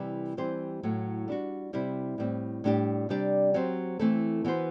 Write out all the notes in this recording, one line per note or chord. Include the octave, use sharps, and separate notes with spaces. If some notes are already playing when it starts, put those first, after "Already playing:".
Already playing: C3 E3 G3
E3 G3 C4 G4 C5
A2 F#3 A3
G3 D4 F#4
C3 G3 C4 E4
A2 G3 C4
A2 G3 D4 G4
C3 G3 D4 G4 D5
F#3 C4 G4 C5
E3 A3 C4 E4 A4
E3 B3 F#4 C5